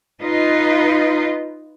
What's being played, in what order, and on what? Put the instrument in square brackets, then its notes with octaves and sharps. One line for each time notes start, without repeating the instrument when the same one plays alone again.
[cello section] D#4 F4 B4 D#5